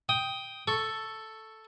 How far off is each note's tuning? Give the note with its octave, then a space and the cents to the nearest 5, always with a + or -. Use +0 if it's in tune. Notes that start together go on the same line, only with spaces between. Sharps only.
G5 +0 D#6 +10
A4 +0 C#6 +0